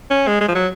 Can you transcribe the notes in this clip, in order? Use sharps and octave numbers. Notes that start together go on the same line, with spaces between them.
C#4
G#3
G#3
F3
F#3